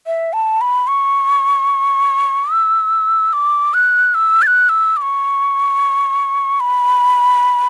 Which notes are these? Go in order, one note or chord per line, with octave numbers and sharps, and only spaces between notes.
E5
A5
B5
C#6
E6
D6
F#6
E6
A6
F#6
E6
D6
C#6
B5